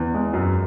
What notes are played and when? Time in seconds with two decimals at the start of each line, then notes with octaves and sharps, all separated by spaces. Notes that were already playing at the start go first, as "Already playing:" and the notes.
Already playing: E2
0.14 G#3
0.33 F#2